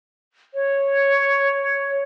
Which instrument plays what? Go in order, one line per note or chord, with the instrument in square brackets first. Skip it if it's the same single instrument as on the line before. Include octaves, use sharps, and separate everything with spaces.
[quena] C#5